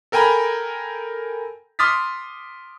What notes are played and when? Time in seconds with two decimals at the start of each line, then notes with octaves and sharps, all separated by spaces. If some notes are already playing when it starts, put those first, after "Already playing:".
0.12 A4 A#4 G5 G#5 A#5 B5
1.79 C6 D6 D#6 F6 A6 B6